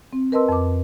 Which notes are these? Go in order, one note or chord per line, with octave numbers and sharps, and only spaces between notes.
C4
A#4 B4 D#5 A5 C6 E6
F2 D6